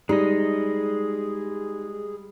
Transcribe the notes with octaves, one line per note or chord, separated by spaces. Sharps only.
G3 G#3 D#4 G#4 D#5